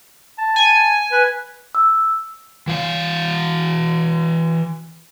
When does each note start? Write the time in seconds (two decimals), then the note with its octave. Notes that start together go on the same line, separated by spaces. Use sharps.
0.38 A5
0.56 G#5
1.12 B4
1.75 E6
2.67 E3 F5